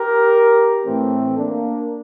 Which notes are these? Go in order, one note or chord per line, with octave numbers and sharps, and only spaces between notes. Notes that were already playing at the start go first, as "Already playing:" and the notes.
Already playing: G4 A#4
A2 E3 A3 C4
A#3 D4